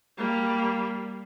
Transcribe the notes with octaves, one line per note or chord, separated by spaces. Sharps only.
G3 A#3